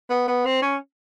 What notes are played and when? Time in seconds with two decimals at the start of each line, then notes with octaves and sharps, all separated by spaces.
0.10 B3
0.28 B3
0.45 C4
0.62 C#4